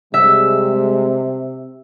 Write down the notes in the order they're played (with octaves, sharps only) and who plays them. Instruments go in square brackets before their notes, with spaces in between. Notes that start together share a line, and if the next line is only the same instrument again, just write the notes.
[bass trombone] C3 [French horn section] G3 G#3 [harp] E5